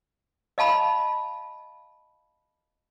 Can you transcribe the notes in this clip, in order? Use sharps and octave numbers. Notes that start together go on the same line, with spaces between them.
D#5 F5 A5 B5